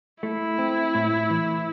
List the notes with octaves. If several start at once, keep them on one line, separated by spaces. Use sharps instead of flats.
A3 E4
C4
A2
E3